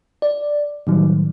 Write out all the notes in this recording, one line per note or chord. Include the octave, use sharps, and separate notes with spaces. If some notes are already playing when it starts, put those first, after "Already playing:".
D5
A2 D#3 F#3 G3